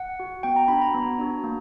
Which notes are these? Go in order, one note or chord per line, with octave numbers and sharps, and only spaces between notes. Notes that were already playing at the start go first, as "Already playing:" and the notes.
Already playing: F#5
F#4
B3 G5
A#5
D4 F#4 B5
A#5
B3
D4 F#4
A#3